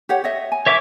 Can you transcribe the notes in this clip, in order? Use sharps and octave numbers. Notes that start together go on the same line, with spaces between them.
G4 C#5 F#5
C#5 D#5 E5
G#5
C#5 E5 D6